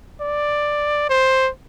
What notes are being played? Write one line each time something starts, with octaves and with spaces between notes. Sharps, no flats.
D5
C5